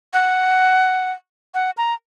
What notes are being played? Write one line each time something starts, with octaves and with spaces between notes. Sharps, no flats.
F#5
F#5
A#5